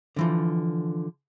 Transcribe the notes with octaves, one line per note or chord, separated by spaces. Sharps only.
D3 E3 F3